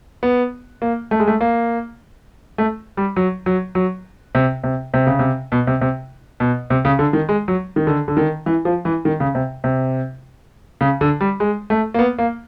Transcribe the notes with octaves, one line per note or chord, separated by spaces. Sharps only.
B3
A#3
A3
G#3
A3
A#3
A3
G3
F#3
F#3
F#3
C3
C3
C3
C#3
C3
B2
C3
C3
B2
C3
C#3
D3
D#3
G#3
F#3
D#3
D3
D3
D#3
E3
F3
E3
D#3
C#3
C3
C3
C#3
D3
G3
G#3
A3
A#3
B3
A#3